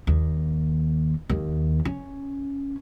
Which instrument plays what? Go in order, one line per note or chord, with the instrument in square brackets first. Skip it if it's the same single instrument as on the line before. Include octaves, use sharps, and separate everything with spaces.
[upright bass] D#2
D#2
C#4